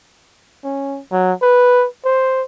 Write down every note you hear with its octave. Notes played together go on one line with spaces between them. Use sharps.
C#4
F#3
B4
C5